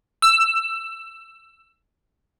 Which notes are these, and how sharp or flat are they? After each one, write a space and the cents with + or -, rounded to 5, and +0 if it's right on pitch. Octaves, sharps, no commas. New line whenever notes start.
E6 +20